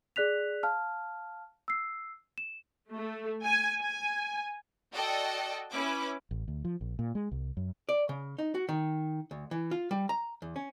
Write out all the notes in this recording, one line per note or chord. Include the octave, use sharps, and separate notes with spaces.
G#4 D5 F#6 B6 F7
F5 A5 F6
E6 C7
E7
A3
G#5
G#5
F#4 A4 D5 D#5 G5
C#4 E4 B4 D6
A1
D2
F3
A#1
A#2
G#3
C2
F#2
D5
C#3
D#4
F#4
D#3
D2
E3
F4
G3
A#5
E2
C#4